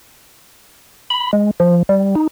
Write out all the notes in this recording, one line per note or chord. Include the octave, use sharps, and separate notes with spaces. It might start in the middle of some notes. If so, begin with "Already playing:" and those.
B5
G#3
F3
G3
D#4